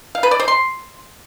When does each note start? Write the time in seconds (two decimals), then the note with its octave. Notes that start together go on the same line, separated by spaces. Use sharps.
0.15 F5
0.23 B4
0.31 D5
0.40 C5
0.48 C6